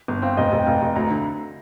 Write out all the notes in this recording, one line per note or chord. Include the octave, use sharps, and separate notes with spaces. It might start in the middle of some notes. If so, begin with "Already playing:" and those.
G1
C4 F5
F1 D#5
F1
G5
F1 F5
F1
D2 A#5
D3